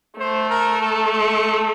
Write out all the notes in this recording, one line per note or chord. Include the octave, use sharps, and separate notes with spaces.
A3 C5
A#4
A4
A4